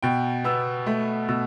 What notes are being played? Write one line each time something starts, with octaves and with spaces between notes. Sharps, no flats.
B2 G5
B3 E6
A3
B2 E6